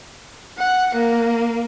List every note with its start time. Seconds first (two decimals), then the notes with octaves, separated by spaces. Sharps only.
0.58 F#5
0.95 A#3